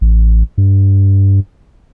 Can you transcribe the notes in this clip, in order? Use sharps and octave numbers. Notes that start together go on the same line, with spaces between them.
A1
G2